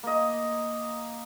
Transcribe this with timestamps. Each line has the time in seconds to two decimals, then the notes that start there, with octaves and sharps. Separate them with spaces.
0.03 A#3 D#5